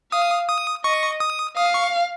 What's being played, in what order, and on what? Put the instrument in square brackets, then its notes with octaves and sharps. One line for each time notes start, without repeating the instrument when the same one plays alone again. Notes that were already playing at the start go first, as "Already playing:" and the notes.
[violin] F5 [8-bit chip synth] D#6
[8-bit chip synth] D#6
[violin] D#5 [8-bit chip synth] C#6
[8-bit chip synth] D#6
[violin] F5 [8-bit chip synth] D#6
[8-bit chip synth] C#6